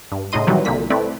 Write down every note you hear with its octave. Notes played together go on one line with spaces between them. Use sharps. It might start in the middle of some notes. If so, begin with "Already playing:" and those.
G2
A2 C#3 D#4 D#5 C6 D#7
C3 D#3 E3 F#3 G3
C2 A#2 D3 A#3 B6
A3 C4 E4 B4 D5